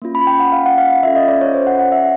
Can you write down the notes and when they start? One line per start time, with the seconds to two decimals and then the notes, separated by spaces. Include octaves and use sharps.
0.02 A#3 C#4 F4
0.15 B5
0.27 G5
0.40 F#5
0.52 F5
0.66 F#5
0.78 F5
0.90 F5
1.03 C#4 F4 A4 E5
1.16 D#5
1.28 D5
1.41 C#5
1.54 C5
1.67 F#5
1.79 F#5
1.92 E5